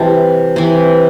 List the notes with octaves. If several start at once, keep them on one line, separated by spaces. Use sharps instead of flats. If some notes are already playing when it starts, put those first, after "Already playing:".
Already playing: C3 E3 G3 A5
C3 E3